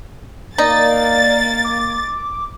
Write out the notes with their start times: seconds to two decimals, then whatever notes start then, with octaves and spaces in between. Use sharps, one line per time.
0.58 A#3 D#4 D5 A6
1.65 D6